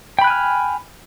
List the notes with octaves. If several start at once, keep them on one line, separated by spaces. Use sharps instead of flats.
G5 G#5 B5 F6 F#6